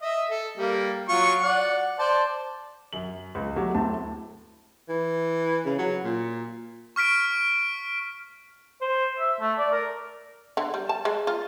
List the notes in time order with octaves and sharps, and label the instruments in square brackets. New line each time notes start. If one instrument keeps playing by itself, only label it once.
[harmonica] D#5 E5
A4
G3 A#3
F#3 F4 C#6
D5 F#5
C5 D5 A5
[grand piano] F#2 F#7
C#2
F#3 A3 G4
D1 A2 A5
[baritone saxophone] E3
C#3
F#3
A#2
[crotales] C#6 F6 B6 D7
[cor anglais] C5
E5
A3
D5
A#4
[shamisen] D3
G3
A5
G#3
F4